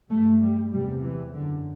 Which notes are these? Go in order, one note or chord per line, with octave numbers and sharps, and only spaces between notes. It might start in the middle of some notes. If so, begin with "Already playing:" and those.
G2 A3
G3
E2 C3 G3
E3
F#2 D3